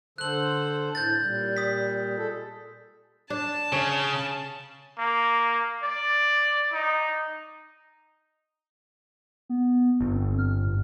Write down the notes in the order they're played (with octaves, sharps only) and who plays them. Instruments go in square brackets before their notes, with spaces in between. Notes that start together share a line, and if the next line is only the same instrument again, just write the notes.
[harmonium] D3 A4 C5 [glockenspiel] F#6 F#7
[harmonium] A2 [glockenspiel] G6 A6
[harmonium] A#2 G3
[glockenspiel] D#6 B6
[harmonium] G#3 A4
[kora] D4 [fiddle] A5
[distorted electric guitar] C#3 [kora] C#5
[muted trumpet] A#3
D5
D#4
[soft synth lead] B3
[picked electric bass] G1
[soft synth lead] C4
F6
G#2